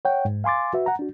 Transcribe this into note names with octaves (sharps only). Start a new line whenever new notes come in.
C#5 F#5 G5
G#2
F5 G#5 C6 D6 A6
F#4 B4 E5
F#5 A#5
D4 F#4